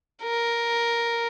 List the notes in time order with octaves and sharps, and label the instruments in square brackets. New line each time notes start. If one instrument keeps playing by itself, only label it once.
[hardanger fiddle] A#4